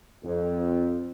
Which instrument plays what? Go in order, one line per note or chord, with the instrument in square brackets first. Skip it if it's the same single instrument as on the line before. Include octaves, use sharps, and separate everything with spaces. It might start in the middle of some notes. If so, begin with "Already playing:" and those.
[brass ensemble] F2